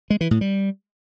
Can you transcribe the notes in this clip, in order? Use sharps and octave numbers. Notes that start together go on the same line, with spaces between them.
G#3
E3
A2
G3